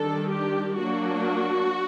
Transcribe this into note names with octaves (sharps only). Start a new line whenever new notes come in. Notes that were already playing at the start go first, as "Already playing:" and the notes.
Already playing: D#3 G3 D4 A4
G4
F#3 A#3 D4 F#4